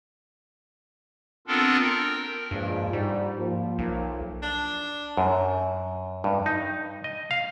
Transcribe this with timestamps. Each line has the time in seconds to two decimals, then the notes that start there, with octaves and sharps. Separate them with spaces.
1.47 B3 C4 D4 F4 A4 A#4
1.82 A#4 G5
2.51 G2 A#2 F3 G#3
2.93 G#2 G3
3.37 F3 A#3
3.79 B1
4.43 D4
5.17 F#2
6.24 G2
6.46 D#4
7.04 D#5
7.31 F5